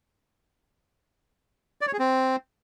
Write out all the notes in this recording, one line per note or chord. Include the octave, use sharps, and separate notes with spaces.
D5
C#5
G#4
C4